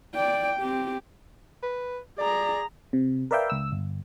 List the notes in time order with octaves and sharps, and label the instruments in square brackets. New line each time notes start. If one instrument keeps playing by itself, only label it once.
[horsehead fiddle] D5 G5
C4 G4
[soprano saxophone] B4
[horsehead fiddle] G#4 A#5 [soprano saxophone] D5
[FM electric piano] C3
A#4 B4 D5 E5 F5 G5
C#2 E6
G1